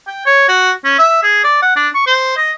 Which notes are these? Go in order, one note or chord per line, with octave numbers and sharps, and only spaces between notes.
G5
C#5
F#4
C#4
E5
G#4
D5
F#5
D4
C#6
C5
D#5